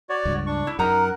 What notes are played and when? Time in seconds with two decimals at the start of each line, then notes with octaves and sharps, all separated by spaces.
0.10 F#4 C#5 D5
0.25 C#2 G2
0.47 D4 C#6
0.67 E4
0.79 F#2 D#4 A#4 F#5 A#5